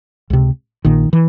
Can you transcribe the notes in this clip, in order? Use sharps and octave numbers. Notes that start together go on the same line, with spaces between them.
C#2 C3
A#1 A#2 D#3
E3